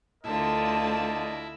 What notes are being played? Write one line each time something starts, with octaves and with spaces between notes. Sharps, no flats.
D2 D3 E4 F4 A#4 D5 D#5 A5